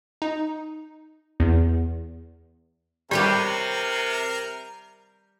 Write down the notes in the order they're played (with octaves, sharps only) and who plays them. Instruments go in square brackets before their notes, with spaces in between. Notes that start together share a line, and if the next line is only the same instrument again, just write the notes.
[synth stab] D#4
E2
[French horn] C3 [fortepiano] G3 [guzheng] G4 B4 C#5 [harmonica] A#4